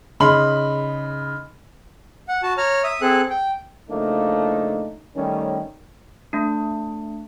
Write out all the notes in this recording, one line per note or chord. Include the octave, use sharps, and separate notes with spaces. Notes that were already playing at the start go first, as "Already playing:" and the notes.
C#3 D#4 B5 C6 F#7
F#5
F#4 A5
C#5 A#5 F6
E5 D#6
C4 G#4 A4 F#6
G5
C#3 F3 A3 A#3 D4 D#4
D#3 G3 A3 C#4
A3 D4